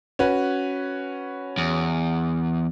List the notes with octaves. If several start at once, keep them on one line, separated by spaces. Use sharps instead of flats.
C#4 F#4 B4
E2